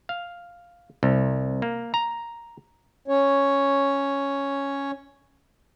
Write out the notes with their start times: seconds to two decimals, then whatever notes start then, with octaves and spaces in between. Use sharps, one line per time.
0.09 F5
1.03 C2
1.62 A#3
1.94 A#5
3.08 C#4 C#5